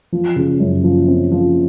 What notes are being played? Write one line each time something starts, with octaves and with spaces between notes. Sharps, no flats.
F3
C#3
F#2
F3
C4
F3